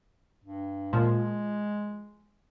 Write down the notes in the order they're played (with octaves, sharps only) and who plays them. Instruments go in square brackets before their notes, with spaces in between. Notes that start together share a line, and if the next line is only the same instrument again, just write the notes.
[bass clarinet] G2
[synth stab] A#2 F3 [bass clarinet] G#3